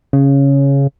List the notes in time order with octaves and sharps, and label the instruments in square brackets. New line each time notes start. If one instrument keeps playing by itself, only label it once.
[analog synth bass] C#3